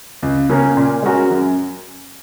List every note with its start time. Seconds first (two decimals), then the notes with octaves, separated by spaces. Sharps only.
0.22 C#2
0.49 C#3 A#3 C#4 A#4
0.77 A#2
1.03 G#3 C#4 F#4 A#4
1.30 F#2